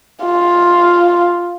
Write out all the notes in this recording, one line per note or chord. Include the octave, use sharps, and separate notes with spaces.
F4